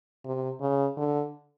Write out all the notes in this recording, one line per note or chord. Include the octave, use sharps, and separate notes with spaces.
C3
C#3
D3